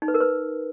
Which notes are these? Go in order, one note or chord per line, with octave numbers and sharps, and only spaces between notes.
D#4
B4
A#4
B4